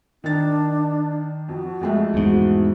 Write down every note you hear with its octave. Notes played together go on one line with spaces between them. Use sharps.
D#3 D4 A6
F2 F#4
F2 G#3 A3
E2 G#2 F#4